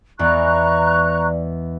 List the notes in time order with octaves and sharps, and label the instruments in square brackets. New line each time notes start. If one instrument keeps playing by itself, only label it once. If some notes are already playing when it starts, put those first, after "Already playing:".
[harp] E2 G#3 B3 [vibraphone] D5 [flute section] A#5 C#6 F#6